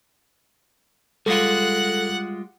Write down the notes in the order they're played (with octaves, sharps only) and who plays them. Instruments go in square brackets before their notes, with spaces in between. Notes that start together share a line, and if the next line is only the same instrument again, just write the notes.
[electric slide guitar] G3 G#3 F4 [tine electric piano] A4 [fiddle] F#5 F#6